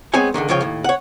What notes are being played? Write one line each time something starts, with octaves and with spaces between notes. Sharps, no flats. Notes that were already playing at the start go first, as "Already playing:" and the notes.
G#3 B3 C4 G#4 C#5 G#5
C#2 F#2 D3 D#3
C#2 C#3 F3 C#5 G5
D#2 A2
C#5 F#5